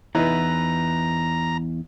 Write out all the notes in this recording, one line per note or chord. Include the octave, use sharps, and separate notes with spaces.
E2 D#4 E4 B4 A#5